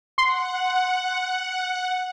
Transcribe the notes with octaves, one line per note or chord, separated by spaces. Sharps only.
F#5 C6